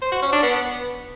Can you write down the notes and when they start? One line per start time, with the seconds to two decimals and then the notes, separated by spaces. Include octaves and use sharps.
0.02 C5
0.12 F#4
0.22 C#4
0.33 D4
0.43 B3